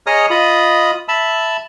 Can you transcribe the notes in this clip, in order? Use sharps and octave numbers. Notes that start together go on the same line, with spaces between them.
G#4 C#5 D#5 A#5 D#6 F6
F4 D#5 B5 D#6
E5 A5 B5 E6